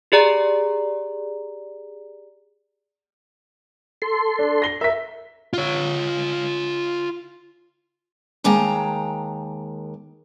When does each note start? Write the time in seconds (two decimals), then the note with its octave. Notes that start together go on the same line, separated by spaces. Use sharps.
0.12 G4 G#4 D5 A#5
4.02 A4 C6
4.39 D4
4.62 A#6 G7
4.81 A#4 E5 B6
5.53 F4 C#5
8.44 D#2 G#3 A#3 G5 A5 A#5